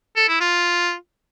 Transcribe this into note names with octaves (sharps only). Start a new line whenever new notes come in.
A4
E4
F4